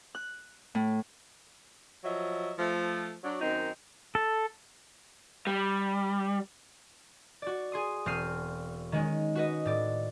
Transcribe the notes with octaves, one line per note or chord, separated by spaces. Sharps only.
F#6
A2
F3 F#3 D#5 E5
F3 A3
F#3 D4
F#2 D#3 C4 D#4
A4
G3
F#4 D5
G#4 C6 D#6
E1 C4 F6 C7 D#7
D#3 G#3 C#4
F#4 B4 D#5
A2 D5